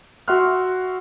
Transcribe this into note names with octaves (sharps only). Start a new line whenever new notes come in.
F#4 E5 F#5 C6 F6 F#6